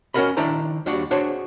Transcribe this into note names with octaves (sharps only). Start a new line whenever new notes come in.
C#4 F4 F#4 A#4 D#5 B5
D#3 D4 E4 C5 A#5
D#2 G3 D4 F#4
D4 F#4 G#4 C5 C#5